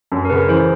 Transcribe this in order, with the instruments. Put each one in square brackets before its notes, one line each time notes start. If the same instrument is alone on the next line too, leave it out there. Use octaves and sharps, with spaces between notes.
[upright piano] F#2
[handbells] A#4
[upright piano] C#3 [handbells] B4
[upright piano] E3 [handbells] C5